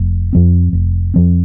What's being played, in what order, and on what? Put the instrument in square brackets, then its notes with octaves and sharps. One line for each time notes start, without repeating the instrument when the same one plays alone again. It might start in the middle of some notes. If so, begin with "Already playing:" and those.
Already playing: [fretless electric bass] F1
F2 F3 C4
F1
F2 F3 C4